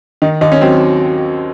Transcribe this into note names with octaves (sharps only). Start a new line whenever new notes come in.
D#3 D#4
D#2 D#4
C#4
F#3 C4